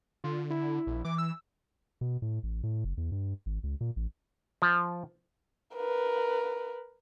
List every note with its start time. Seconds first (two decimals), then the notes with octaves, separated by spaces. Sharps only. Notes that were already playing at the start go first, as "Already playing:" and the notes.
0.24 D3 F4
0.50 E4
0.87 A#1
1.05 E3 D6
1.18 E6
2.01 B2
2.22 A2
2.43 A1
2.63 A2
2.85 F#1
2.97 E2
3.12 G2
3.46 G#1
3.63 C#2
3.81 A#2
3.96 A1
4.62 F3
5.75 A#4 B4